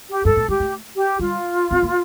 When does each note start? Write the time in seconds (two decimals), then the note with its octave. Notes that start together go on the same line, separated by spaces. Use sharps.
0.09 G4
0.24 G2 A4
0.36 A2
0.48 G3 G4
0.60 A3
0.95 G4
1.19 G3 F4
1.71 C4
1.83 A#3